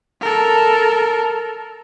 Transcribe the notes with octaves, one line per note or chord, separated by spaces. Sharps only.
A4 A#4